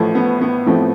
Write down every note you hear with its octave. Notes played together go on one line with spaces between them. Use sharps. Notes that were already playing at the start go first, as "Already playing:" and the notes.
Already playing: A1 A2 F3 A3
B3
B3
A1 A2 F3 A3 C4